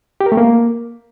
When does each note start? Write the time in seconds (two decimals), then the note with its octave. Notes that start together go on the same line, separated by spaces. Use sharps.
0.21 G4
0.26 A#4
0.32 A3
0.37 A#3